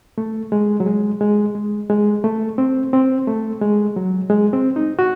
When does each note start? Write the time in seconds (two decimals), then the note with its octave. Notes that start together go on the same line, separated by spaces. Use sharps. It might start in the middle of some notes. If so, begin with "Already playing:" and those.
0.18 A3
0.52 G#3
0.80 F#3
0.86 G#3
1.21 G#3
1.55 G#3
1.90 G#3
2.24 A3
2.58 C4
2.93 C4
3.28 A3
3.62 G#3
3.96 F#3
4.30 G#3
4.53 C4
4.76 D#4
4.99 F#4